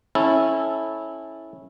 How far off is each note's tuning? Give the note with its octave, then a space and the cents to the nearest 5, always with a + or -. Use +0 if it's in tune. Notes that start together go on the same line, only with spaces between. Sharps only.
C#4 -20 E4 -15 A4 -5